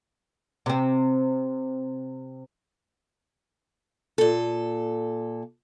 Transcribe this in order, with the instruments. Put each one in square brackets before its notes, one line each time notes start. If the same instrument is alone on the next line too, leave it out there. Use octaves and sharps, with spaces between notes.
[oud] C3 C4
[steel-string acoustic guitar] A#2 A4